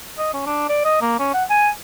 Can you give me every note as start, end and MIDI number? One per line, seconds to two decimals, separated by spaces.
0.18 0.30 75
0.34 0.46 61
0.46 0.65 62
0.69 0.81 74
0.85 0.99 75
1.02 1.18 58
1.19 1.33 61
1.34 1.44 78
1.50 1.69 80